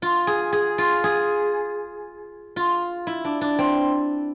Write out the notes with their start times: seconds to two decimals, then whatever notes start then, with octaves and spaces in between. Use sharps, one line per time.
0.02 F4
0.27 G#4
0.53 G#4
0.78 F4
1.04 G#4
2.56 F4
3.07 E4
3.25 D4
3.41 D4
3.59 C4